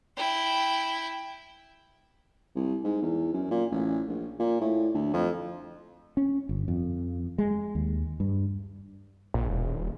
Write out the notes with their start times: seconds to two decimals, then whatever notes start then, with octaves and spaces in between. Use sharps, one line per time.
0.17 E4 G5
2.56 C2
2.84 G#2
3.02 E2
3.34 F#2
3.51 A#2
3.72 A1
4.08 A#1
4.40 A#2
4.61 A2
4.94 D2
5.14 F2
6.17 C#4
6.49 G1
6.68 F2
7.38 G#3
7.75 D#2
8.20 G2
9.34 A#1
9.49 E1
9.71 D#1